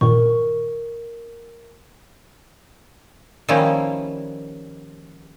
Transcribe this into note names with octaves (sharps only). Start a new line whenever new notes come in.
G2 A#2 D#3 A#4 C#6
D#3 F3 G3 A#3 C#4 E4